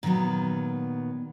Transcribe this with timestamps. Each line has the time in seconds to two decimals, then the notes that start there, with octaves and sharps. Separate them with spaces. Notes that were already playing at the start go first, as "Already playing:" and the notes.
0.03 A#2 D#3 F3 F#3 B3